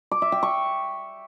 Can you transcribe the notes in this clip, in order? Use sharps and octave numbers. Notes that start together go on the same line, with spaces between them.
D6
E5
G5
C#6